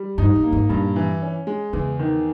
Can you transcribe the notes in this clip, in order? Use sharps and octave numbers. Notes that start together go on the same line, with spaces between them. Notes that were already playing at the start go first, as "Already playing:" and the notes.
Already playing: G3
G2 D#4
G#2
A#3
G#2
G2 A#2
E3
C#4
G#3
E2 C#3
D#3